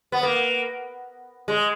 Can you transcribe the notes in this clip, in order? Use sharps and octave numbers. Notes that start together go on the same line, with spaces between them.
B3
A#3
G#3